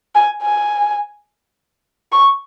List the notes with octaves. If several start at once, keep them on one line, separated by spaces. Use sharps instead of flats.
G#5
G#5
C#6